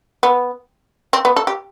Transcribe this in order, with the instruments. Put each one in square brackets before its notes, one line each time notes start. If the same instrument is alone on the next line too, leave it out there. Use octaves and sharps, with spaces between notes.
[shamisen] B3
C4
B3
A4
G4